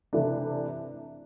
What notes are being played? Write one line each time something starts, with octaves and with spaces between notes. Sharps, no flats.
C3 E3 A3 D4